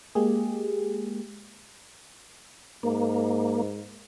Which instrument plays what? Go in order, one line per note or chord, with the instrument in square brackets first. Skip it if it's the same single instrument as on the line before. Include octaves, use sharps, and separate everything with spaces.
[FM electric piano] G#3 A#3 G4 G#4
[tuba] G#2 [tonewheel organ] A#3